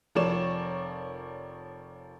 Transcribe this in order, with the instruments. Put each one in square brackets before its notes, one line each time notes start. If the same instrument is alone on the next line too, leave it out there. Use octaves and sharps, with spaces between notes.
[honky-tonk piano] F1 F3 A#4 C#5 D5 E7